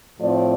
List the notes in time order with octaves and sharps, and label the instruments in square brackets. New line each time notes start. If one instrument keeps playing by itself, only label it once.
[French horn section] A2 F3 A3 C4 D5